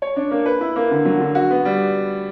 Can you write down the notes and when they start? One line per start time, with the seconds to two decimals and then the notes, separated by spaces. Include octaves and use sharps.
0.02 C#5
0.16 D4
0.31 A#3
0.46 B4
0.61 E4
0.76 A#3
0.91 D3
1.05 F#3
1.20 D3
1.35 F#4
1.51 B3
1.65 G3